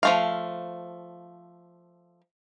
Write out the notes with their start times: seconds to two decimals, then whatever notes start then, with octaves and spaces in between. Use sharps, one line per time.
0.03 F3 A3 F5